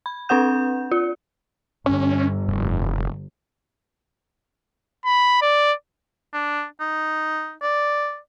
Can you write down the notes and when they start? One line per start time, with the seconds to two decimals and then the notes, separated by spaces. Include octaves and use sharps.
0.06 B5
0.29 C4 D4 B4 F#5 G6
0.92 F4
1.86 G1 C#4
2.48 F1
5.05 B5
5.42 D5
6.34 D4
6.80 D#4
7.62 D5